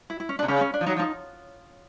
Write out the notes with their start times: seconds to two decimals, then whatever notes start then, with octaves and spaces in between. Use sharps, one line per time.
0.10 E4
0.20 E4
0.29 C#4
0.39 D4
0.43 C3
0.48 C#3 C#4
0.61 C#4
0.74 D4
0.81 F3
0.86 F#3 D#4
0.97 F3
1.00 D#4